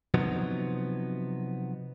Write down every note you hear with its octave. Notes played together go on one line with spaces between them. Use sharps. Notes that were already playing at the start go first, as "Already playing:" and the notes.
C3 F3 F#3 B3 D#4